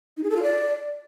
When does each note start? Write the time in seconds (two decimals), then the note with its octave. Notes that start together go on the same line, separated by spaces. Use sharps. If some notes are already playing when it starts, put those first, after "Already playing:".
0.17 D#4
0.23 G#4
0.30 A4
0.36 F4
0.43 D5